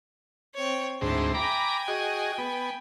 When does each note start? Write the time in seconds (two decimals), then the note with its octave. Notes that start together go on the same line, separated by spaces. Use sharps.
0.55 C4 C#5
1.01 D2 G#2 C4 E4 A5
1.34 G5 G#5 A#5 B5 D6
1.88 F#4 G#4 D#5
2.38 B3